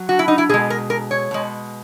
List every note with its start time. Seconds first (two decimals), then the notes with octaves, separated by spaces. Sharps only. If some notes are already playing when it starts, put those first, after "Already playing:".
Already playing: F#3
0.09 F#4
0.19 E4
0.28 D#4
0.38 E4
0.49 B2 G#3 G#4
0.70 A#4
0.90 A#4
1.11 C#5
1.31 B2 G#3